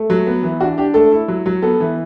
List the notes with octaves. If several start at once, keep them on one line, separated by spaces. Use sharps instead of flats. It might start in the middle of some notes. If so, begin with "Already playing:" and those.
Already playing: A3
F#3
B3
E3
D4 F#4
D4 G4
A3 A4
E4
F#3
F#3
B3 A4
E3